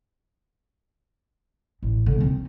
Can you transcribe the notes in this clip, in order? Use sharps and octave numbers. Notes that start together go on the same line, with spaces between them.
A1
D3
C4 D#4